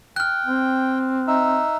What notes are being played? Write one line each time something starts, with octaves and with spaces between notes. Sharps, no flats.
G5 F6 F#6
C4
D#4 E5